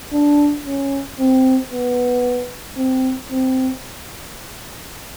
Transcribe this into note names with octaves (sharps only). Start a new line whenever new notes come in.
D4
C#4
C4
B3
C4
C4